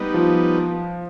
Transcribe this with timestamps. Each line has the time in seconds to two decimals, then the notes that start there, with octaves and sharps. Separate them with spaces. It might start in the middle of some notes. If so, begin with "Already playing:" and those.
Already playing: G3 B3 D#4
0.14 F3